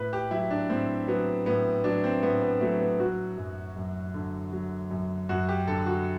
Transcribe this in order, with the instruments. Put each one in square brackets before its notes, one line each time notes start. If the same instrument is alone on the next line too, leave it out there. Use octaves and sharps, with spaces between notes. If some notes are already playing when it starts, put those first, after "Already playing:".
Already playing: [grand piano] A2 B4
G4
F#3 E4
D4
A2 C4
F#3 B3
A2 B3
F#3 D4
C4
A2 B3
B3
F#3 A3
B3
F#3 F#4
F#2
F#2
D3
F#3
F#2
F#2 F#4
G4
D3 A4
F#4